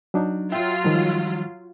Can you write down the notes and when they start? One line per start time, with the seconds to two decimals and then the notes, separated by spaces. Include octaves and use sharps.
0.14 F#3 D4 D#4
0.52 F#3 F4 E5 G5
0.84 D#3 F3 G3